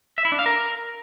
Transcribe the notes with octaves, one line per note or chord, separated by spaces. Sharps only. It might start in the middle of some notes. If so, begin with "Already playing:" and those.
E5
E4
D4
F5
A#4